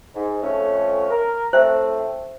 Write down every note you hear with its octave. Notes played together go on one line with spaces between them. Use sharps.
G#2
F2 A3 C#4
A#4
A2 A3 C4 C5 E5